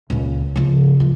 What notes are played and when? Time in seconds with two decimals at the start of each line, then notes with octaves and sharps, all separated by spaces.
0.10 C#2 A#2
0.56 C#3 F3
1.00 F3